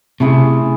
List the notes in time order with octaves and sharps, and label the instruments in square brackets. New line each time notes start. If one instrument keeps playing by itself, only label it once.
[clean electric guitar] C3 [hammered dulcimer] A3 C#4 E4 G#4